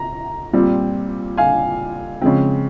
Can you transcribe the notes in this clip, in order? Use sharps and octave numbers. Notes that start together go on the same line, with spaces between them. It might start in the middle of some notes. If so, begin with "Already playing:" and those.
Already playing: A#5
A#2 G3 C4
F5 G#5
C#3 F3 G#3 C4